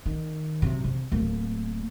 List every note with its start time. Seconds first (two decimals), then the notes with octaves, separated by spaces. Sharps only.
0.06 D#3
0.62 F#2 C3
0.84 C3
1.12 D1 A#3